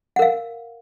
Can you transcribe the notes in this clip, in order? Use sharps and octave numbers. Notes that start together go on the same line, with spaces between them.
A#4 F5 F#5